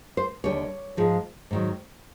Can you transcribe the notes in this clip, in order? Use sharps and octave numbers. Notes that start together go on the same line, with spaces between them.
C5
D#2 D3 G3 C#5
G#2 F3 G#3
G#2 D#3 F#3